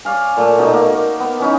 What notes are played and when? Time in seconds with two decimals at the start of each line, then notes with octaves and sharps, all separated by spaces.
0.05 C#5 D5 F5 G#5
0.37 A#2 A3
0.58 B2 D#4
0.73 A#3
1.20 B3
1.40 E3 C#4 D#4